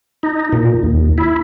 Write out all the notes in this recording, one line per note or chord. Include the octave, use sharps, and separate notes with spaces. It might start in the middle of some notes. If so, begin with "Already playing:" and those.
D#4
A#2
D#2
E4